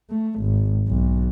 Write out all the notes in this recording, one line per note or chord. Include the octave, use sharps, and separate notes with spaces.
A3
G#1
B1